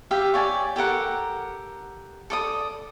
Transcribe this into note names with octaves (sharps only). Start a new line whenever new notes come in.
G4 E5 F5
C#5 D5 G#5
G4 A4 A#4 F#5
A4 D5 D#6